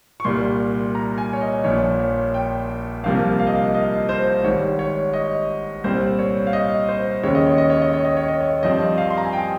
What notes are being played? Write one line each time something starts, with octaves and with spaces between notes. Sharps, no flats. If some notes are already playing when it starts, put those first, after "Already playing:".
C#6
C2 A#2 G3 C6
A#5
G#5
C#5
D#5
A#1 A#2 F3 C#5
C#5
G5
C2 C3 F3 A#3 F5
F5
D#5
F5
D#5
C5
G#1 G#2 G3 C#5
C#5
D#5
C2 A#2 G3 C4 C5
C#5
F5
D#5
C5
D#2 C#3 G#3 C#5
D#5
C#5
D#5
C#5
D#5
C#5
D#5
C#5
D#5
C#5
G2 F3 C4 D#5
F5
C6
A#5
G#5
G5